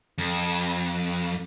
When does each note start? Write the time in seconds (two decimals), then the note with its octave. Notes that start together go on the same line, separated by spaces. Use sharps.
0.18 F2